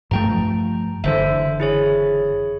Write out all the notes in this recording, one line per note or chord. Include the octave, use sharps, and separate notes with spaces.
G2 F3 A3 G5 A#5
F#1 D3 E3 A4 C5 E5
E4 G#4 C#5